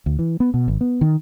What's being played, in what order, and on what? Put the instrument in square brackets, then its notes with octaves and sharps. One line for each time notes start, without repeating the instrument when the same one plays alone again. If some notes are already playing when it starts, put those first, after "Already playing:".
[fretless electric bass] D2
E3
B3
B2
G#1
B3
D#3